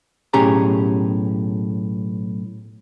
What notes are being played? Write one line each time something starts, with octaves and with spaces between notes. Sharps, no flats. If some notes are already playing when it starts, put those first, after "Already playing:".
B1 A2 C#4 G4 G#4 A#5